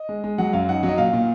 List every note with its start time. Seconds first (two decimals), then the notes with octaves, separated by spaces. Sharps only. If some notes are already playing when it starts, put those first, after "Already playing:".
Already playing: D#5
0.09 G#3
0.24 G#3
0.38 F#3 F#5
0.53 F#2 F5
0.69 D#4 F#5
0.83 F#3
0.88 D#5
0.98 A#2 F5
1.13 A#2